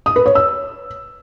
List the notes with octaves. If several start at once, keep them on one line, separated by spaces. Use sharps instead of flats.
D#6
B4
C#5
E6